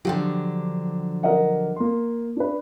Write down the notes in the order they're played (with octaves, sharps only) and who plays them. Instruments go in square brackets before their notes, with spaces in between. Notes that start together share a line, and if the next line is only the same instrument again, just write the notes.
[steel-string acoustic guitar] D3 F3 F#3 [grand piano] G4 G5
[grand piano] A#4 D#5 F#5
A#3 C6
D4 B4